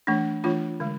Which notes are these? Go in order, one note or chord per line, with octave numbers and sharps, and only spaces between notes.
E3 A3 D4
E3 A3 D4 F4
D3 G#3